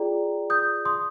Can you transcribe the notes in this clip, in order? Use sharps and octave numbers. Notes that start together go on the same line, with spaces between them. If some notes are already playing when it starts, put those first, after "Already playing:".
Already playing: F4 G#4 D5 G5 A#5
D#6 G6
C6 D#6